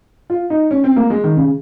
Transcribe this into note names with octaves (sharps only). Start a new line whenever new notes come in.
F4
D#4
C#4
C4
A#3
G#3
D#3
C#3